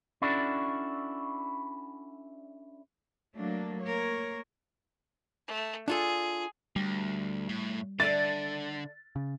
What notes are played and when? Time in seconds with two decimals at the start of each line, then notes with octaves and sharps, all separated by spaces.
0.22 C#4 D4 E4 F#4 A4 D5
3.35 F#3 A3 A#3 D4
3.84 A#3 A#4 C#5
5.47 A3
5.88 D4 F4 G#4 A4
6.76 D2 G3
7.49 A2
8.00 D3 A4 D5 E5 A6
9.16 C#3